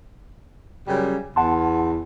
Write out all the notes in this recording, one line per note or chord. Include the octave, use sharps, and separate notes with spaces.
F#2 C#3 G3
E2 F#5 A5 C6